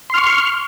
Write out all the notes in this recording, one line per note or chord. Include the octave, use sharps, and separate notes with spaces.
C6 C#6 F6